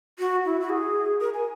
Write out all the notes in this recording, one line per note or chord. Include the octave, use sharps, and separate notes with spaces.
F#4
E4
F#4
G#4
A#4
G#5